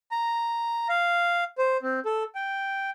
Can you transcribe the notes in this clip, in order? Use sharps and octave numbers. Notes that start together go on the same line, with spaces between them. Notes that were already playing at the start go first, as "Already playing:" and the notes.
A#5
F5
C5
C4
A4
G5